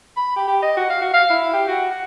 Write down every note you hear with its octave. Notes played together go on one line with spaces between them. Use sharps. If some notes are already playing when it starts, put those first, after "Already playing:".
B5
G4
G4
D#5
F#4
F5
F#4
F5
E4
G4
F#4
F#5